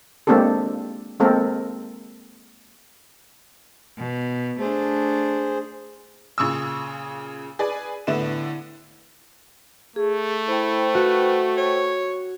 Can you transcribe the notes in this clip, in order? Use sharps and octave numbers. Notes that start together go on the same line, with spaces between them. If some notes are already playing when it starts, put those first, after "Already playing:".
G#3 A#3 C4 D4 G4 A4
G#3 A#3 C4 A4 A#4
B2
A3 D4 G#4 C5
A#2 C#3 C#6 D#6 E6
G#4 B4 D5
A2 D3 B3 E4 E7
A3 G#4
E4 C5 G5
F#4 B4
C#5